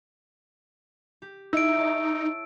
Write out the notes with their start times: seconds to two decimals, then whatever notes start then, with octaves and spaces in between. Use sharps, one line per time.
1.22 G4
1.53 D#4 E4 G#4 E6 D7
1.78 C#5 A5